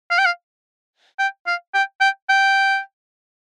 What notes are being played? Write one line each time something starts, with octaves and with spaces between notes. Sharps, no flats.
F5
G5
F5
G5
F5
G5
G5
G5